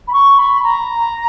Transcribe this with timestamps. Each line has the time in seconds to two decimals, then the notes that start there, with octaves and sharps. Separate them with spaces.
0.07 B5
0.13 C#6
0.38 B5
0.63 A#5